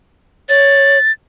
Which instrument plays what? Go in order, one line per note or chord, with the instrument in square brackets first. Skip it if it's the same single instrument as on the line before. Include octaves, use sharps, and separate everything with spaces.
[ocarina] C#5 [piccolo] A6